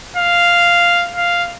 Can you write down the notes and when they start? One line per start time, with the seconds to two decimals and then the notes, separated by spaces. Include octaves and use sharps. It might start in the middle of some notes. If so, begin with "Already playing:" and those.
0.17 F5
1.16 F5